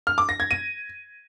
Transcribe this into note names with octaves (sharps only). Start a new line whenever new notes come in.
F6
D6
A#6
G#6
D#7